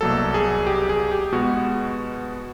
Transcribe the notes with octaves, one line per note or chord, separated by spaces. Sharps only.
C2 B2 F#3 A#3 A4
G#4
G4
G#4
G4
B2 G#3 B3 F#4